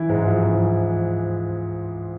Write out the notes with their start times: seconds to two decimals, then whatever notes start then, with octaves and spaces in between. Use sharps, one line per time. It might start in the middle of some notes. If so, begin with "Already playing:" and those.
Already playing: E3 E4
0.09 G#2 G#3
0.28 F3
0.46 E3